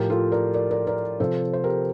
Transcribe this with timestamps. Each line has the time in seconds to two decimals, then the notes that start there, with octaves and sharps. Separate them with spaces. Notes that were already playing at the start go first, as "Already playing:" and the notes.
Already playing: A2 F3 G4 A#4
0.10 F4 A4
0.32 A#4 D5
0.54 A#4 D5
0.71 A#4 D5
0.87 A#4 D5
1.20 C3 F3 A4 C5
1.53 C5
1.64 G4 A#4